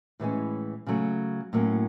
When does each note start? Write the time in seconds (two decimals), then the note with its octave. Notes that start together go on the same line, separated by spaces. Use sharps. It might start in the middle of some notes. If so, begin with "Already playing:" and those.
0.20 A2 E3 G#3 C#4
0.87 C#3 F#3 A3
1.53 A2 F#3 A#3 C#4